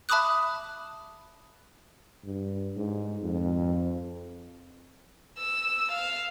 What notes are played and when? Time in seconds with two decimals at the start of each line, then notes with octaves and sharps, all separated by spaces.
0.09 E5 A5 B5 D6 D#6 F#6
2.25 G2
2.77 G#2
3.22 F2
5.39 E6
5.92 F5